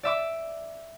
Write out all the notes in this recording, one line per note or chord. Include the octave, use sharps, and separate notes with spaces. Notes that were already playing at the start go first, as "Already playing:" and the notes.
D5 E5 D6